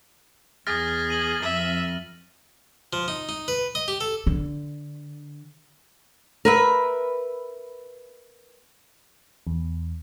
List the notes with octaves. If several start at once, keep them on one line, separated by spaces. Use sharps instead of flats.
E2 G#4 F6 A6 A#6
D#7 F#7
F2 E5
F3
D#4
D#4
B4
D#5
G4
A4
D3
A#4 B4 E5
E2